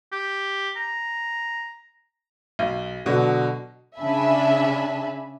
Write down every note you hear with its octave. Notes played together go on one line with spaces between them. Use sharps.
G4
A#5
B1
B2 D3 F#3
C#3 D4 E5 G#5 A5 B5